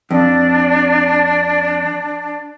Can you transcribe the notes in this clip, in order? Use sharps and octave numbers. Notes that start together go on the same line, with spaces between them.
F2 D4